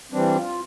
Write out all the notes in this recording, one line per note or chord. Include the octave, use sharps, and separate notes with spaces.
E3 G3 C4 D4
F4